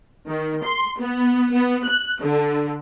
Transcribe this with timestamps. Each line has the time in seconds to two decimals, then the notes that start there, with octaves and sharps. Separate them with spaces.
0.29 D#3
0.64 C6
1.00 B3
1.53 B3
1.85 F#6
2.21 D3